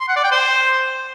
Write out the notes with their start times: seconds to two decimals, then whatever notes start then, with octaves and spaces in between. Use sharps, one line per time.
0.01 C6
0.08 F#5
0.16 D5
0.24 G5
0.31 C5